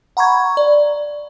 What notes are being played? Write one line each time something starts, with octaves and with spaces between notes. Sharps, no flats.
F#5 A#5 B5 C#6 G#6
D5